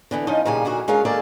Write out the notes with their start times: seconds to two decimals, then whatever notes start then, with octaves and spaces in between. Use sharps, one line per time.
0.11 D3 E3 B3
0.27 F3 C#4 D#4 D#5
0.46 A#2 C#3 F3 G3 G#5
0.65 A#2 D3 F#4 G#4
0.88 G#3 C#4 F4 A#4 C#5 F5
1.05 D#3 A#3 G#4 A4 D5 A5